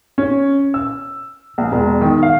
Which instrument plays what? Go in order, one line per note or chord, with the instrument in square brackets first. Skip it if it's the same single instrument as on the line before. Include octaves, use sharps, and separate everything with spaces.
[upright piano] C#4
E6
A#1
E1
D#3
F5